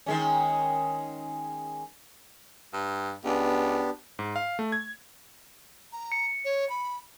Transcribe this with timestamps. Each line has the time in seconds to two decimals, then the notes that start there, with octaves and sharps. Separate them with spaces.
0.06 D#3 G#3 C#4
2.73 G2
3.25 C#2 B3 D4 G4
4.19 G#2
4.36 F5
4.59 A3
4.72 G#6
5.93 A#5
6.12 C#7
6.45 C#5
6.70 B5